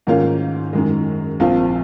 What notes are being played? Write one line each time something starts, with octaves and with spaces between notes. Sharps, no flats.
G#2 D#3 A#3 C#4 F4
F#2 D#3 G#3
A#1 A#2 F3 C4 F4